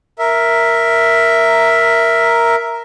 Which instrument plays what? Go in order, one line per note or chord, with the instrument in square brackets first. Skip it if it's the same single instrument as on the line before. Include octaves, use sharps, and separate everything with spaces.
[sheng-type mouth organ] A#4 E5